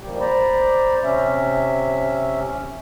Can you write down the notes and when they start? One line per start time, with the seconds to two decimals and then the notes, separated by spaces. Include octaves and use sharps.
0.01 A#2 D#3 F3 G3 A#3 G4
0.20 C5 D5 A#5 B5
1.03 C3 C#4 E5